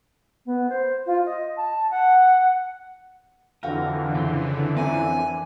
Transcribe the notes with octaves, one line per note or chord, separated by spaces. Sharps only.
B3
C5
F4
D#5
A5
F#5
F2 D3 E3 F#4 A#4 F5 G5
C#3 C#4 C6
C4 C#4 E4 A#4 D5 G#5